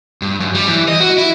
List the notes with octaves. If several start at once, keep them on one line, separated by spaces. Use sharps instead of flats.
G2
F#2
G3
E3
D#5
F#4
E4